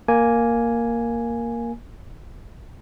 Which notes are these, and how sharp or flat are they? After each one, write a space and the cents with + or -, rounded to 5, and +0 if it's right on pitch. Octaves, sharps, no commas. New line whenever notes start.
A#3 +0 G#5 +0